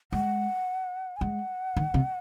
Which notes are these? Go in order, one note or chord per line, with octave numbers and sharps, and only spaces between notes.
G#3 F#5
G#5
G#3 F#5
D#3
C3